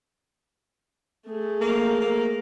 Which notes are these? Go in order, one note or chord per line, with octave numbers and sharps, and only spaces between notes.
A3 G#4
A#3
A#3